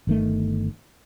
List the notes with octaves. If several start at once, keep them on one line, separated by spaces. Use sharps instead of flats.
G1 D#3 A3